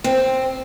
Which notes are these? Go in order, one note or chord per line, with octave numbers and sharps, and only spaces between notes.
C4